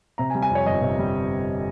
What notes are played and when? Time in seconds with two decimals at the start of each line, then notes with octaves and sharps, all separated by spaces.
0.18 C3 A#5
0.30 G#5
0.35 G3
0.42 G#5
0.50 F2
0.55 C#5
0.66 G1 D#5
0.82 C3
0.99 G3